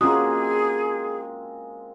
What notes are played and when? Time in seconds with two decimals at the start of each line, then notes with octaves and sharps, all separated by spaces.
0.01 G#3 A#3 C4 C#4 F4 F#4 G#4 D#6